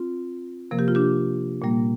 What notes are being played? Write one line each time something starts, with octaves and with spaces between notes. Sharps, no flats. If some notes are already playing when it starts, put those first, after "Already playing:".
Already playing: C4 F4
C3 F3 A#3 A#4
G4
F4
D4 G4
A#2 G3 A#3